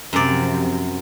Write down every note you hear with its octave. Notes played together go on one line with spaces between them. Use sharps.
F#2 C3 F3 D5